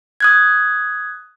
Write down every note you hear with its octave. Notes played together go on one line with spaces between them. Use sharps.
D#6 F#6 G#6